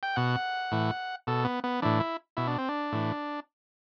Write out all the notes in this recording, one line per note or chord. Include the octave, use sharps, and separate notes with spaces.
G5
B2 F#5
A2 E3
B2 A4
B3
B3
A2 E3 D4
E4
B2 E4
D4
C4
D4
A2 E3